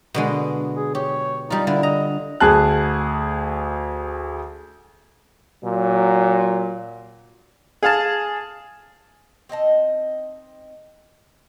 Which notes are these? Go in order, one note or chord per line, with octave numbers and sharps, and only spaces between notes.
B2 D3 G#3
G#4
G4 C#5
G3 D#4 F4
D3 E4
D#5 A#5
D2 G#4 A5 F#6
A#2 F#3
G#4 F5 A5
C4 D#4 D#5 A5